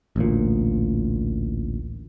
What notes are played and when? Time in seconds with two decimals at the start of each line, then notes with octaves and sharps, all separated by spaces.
0.16 A1 D2 A#2